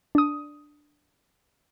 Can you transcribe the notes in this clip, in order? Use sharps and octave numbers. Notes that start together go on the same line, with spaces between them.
D4 D#6